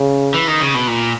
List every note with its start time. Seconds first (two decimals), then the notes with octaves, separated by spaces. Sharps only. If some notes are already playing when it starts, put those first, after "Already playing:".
Already playing: C#3
0.34 E3
0.47 D#3
0.61 C#3
0.74 B2
0.87 A#2